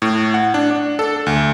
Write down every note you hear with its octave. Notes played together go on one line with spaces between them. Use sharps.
A2
F#5
D4
D4
A4
D2